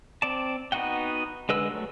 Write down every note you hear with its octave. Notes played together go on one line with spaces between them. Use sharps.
C4 D5 A5
B3 D#4 F#4 F#5 G5
D3 G#3 B4 E6
F#3 A3